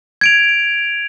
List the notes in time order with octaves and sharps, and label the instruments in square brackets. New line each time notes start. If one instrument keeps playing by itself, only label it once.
[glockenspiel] G#6 D7 F7